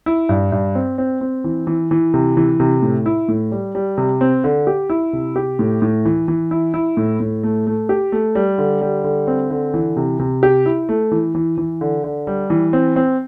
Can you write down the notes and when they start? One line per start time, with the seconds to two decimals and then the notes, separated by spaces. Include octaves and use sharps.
0.06 E4
0.29 G2
0.52 G2
0.75 C4
0.98 C4
1.21 C4
1.44 E3
1.67 E3
1.91 E3
2.14 C3
2.37 E3
2.60 C3
2.82 A2
3.06 E4
3.28 A2
3.52 G3
3.75 G3
3.98 C3
4.21 C4
4.44 D3
4.67 G4
4.90 E4
5.13 C3
5.36 G4
5.59 A2
5.82 A2
6.05 E3
6.28 E3
6.51 E4
6.74 E4
6.97 A2
7.20 A2
7.43 A3
7.67 A3
7.89 G4
8.12 A3
8.35 G3
8.58 D3
8.81 G3
9.04 D3
9.27 C4
9.50 D3
9.74 E3
9.97 C3
10.19 C3
10.43 G4
10.66 E4
10.89 A3
11.11 E3
11.35 E3
11.58 E3
11.81 D3
12.04 D3
12.27 G3
12.50 E3
12.73 C4
12.96 C4